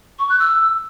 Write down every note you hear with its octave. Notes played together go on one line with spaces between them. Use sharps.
C#6
F#6
E6